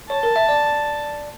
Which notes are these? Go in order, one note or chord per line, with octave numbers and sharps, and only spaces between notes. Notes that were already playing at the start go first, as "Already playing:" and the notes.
C#5 A5
A#4
E5
D5